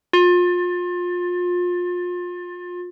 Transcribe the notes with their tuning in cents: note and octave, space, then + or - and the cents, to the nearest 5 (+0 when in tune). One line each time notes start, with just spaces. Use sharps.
F4 +30